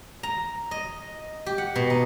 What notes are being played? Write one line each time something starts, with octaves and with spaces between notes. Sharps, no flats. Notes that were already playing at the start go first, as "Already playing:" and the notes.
A#5
D#5
G4
F#5
B2
D#4